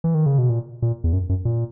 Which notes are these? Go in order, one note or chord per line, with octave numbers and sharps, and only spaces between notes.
E3
D#3
C#3
B2
A#2
A#2
E2
F#2
F#2
A#2